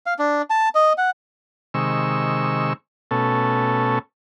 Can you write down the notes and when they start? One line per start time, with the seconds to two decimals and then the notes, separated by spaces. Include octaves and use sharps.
0.06 F5
0.19 D4
0.50 A5
0.75 D#5
0.98 F#5
1.74 C3 D#3 G#3 C#6 E6
3.11 B2 A3 C#4 A4